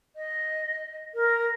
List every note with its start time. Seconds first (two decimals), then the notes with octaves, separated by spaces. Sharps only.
0.16 D#5
1.15 A#4